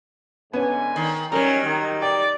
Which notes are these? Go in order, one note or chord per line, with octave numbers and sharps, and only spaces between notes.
G#2 D3 B3 C#4 G#5
D#3
F#3 G3 C#4 D#4 A#4 A#5
D#3
D5 G5